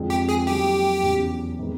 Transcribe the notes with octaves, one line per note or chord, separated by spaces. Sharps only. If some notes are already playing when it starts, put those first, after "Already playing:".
Already playing: F2 D3 F3 G#3
G4
G#4
D#3 F#3 A#3 G4
E2 C#3 F#3
C3 D#3 G#3 B3